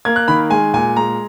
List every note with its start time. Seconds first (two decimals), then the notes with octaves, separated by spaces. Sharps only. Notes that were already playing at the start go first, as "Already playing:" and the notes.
0.05 A#3 G#6
0.16 F#6
0.28 D#3 B5
0.50 G#3 G#5
0.73 A#2 G#5
0.96 G#3 A#5